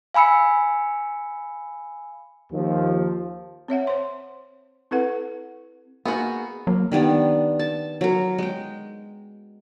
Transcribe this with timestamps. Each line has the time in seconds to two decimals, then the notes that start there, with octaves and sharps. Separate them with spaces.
0.14 F5 G#5 B5 E6 C#7
2.51 D#2 F3
3.68 C4 C#5 E5 F#5
3.87 C5 C6
4.91 C4 E4 A4 B4 F#5
6.05 A#3 B3 D#4 F#4 G#4
6.67 F#3 A#3
6.92 D#3 G3 B3 D4
7.59 A5
8.01 F#3 A#4
8.38 G#3 G5